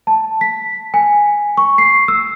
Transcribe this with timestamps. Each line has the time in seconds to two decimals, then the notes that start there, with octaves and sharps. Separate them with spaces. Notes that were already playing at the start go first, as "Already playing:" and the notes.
0.07 A5
0.41 B6
0.94 G#5
1.57 C#6
1.78 C7
2.08 E6